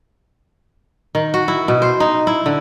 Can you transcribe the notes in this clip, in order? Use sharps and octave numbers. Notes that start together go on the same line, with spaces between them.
D#3
F#4
E4
B2
C5
D#4
E4
D3